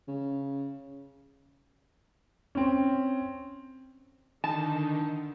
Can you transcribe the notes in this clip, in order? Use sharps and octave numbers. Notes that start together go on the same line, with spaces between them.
C#3
C4 C#4
D3 D#3 A5